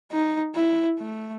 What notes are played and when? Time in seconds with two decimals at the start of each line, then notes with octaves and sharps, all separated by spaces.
0.12 D#4
0.55 E4
0.99 A3